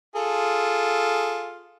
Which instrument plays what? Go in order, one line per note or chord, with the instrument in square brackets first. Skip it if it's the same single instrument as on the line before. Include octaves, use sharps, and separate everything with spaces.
[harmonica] F4 G#4 A4